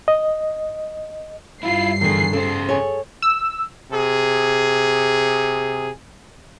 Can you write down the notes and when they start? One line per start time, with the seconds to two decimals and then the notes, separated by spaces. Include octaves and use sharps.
0.08 D#5
1.63 G2 E4 F4 C7
2.01 E2 D3 D#3 G#4
2.33 C#3 A4 C5
2.69 G#4 A4 C#5
3.22 E6
3.92 C3 G#4